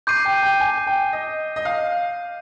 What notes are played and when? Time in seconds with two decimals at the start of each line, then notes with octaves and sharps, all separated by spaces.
0.07 D6 G6 C7 D#7
0.25 G5
0.42 G5
0.60 G#5
0.87 G5
1.13 D#5
1.56 D#5
1.65 F5